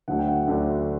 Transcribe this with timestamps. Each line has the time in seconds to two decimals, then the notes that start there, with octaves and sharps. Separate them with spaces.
0.08 D2 D3 F#3 A3 D4 F#5
0.19 G5
0.28 F#5
0.48 D2 D3 F#3 A3 D4